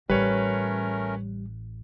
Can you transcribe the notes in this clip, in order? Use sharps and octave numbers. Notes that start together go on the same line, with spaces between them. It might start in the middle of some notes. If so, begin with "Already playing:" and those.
A1 G3 A3 C#4 A#4 B4 C#5